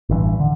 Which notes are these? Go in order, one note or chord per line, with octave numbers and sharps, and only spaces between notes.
A1 G2 E3
D3